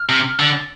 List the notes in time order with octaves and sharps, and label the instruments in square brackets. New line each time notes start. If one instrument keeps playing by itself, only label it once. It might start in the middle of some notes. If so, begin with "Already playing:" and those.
Already playing: [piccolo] F6
[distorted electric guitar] C3
[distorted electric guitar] D3 [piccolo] A6